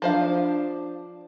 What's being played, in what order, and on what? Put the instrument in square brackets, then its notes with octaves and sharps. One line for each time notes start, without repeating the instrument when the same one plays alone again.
[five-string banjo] F3 C5 F5 [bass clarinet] D4